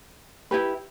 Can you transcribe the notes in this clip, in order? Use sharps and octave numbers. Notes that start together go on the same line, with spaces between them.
E4 G4 B4